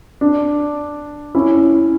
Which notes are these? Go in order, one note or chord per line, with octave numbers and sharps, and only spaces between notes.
D4
C#4 E4